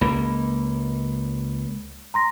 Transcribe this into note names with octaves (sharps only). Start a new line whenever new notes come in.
C#2 A#3 B5
A#5 C6 A#6